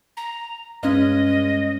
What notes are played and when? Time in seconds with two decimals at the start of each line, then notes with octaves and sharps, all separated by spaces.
0.17 A#5
0.83 G2 G#3 C#4 D#5